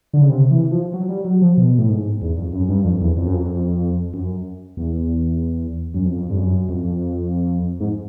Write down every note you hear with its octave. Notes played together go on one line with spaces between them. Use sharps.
D3
C#3
C3
E3
F3
F#3
G3
F#3
F3
B2
A2
G#2
E2
F2
F#2
G2
F2
E2
F2
F#2
F2
F#2
E2
F#2
F2
G2
F#2
F2
G#2